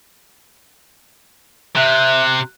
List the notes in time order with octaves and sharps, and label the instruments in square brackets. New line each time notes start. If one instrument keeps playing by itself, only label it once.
[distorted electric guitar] C3 [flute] E5 [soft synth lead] F#6